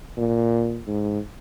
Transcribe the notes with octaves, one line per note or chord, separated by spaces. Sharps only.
A#2
G#2